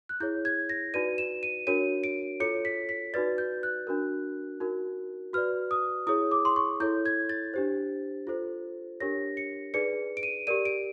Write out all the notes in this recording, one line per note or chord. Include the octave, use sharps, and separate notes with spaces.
F#6
E4 G#4 C#5 G6
G#6
A#6
D#4 F#4 B4 D5 D#7
E7
D#7
D4 F#4 A#4 C#5 D#7
D7
F4 A4 C#5 C#7
B6
B6
D#4 F#4 B4 D5 A6
G6
F#6
D4 F#4 A#4
D#4 F#4 A#4
F#4 B4 D5 F6
D#6
E4 G#4 C#5 D#6
D6
C6
C#6
E4 A4 C#5 G6
G#6
A6
D4 G4 C5
F4 A4 C5
D4 G4 A#4 C#5 A#6
C#7
D#4 G#4 B4 D5 C#7
D7
D#7
G4 A#4 D5 D#7
D7